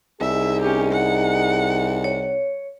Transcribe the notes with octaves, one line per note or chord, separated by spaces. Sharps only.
C2 D#4 G#4 E5
C#4 G4
F#5
C#5